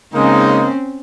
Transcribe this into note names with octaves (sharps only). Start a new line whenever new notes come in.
C#3 G#3 A#3 C4 C#4 D#4